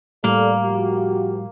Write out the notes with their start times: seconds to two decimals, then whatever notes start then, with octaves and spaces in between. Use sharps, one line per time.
0.24 A2 G3 A#3 A4 D5
0.65 F3 F#4 G4